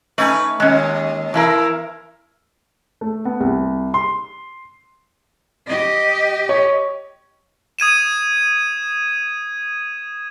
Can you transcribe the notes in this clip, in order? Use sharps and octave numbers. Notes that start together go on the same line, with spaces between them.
A3 C#4 D#4 B4 G#5
D#2 G#3 C#4
E2 E3 E4 A#4
A3
B3
C2
C6
G4 D#5
C#5
D#6 G#6 D#7 E7